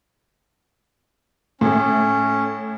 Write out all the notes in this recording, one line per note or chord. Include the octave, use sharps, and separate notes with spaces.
A2 A3 C#4